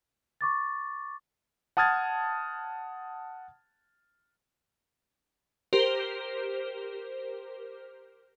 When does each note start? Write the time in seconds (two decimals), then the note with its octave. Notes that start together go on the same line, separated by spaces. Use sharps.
0.41 C#6 D6 A6
1.77 F#5 A5 D#6 F6 G#6 A6
5.73 G4 A#4 C5